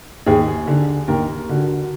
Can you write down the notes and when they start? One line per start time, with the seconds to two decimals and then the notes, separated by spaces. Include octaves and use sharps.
0.26 D#2 G#4
0.67 D3
1.08 D#2 A#4
1.49 D3 F#4